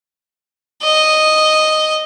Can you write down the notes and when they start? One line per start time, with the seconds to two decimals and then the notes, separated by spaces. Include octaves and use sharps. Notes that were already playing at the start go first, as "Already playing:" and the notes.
0.83 D#5